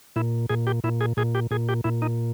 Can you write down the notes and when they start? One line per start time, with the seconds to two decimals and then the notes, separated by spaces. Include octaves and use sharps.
0.16 A#2 E4
0.49 A#2 G#4
0.67 G4
0.84 A#2 E4
1.01 G#4
1.17 A#2 G#4
1.35 G4
1.51 A#2 G#4
1.69 G4
1.84 A#2 E4
2.02 D#4